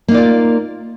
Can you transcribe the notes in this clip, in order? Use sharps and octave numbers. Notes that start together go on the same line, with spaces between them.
A#3 D#4 F4 D5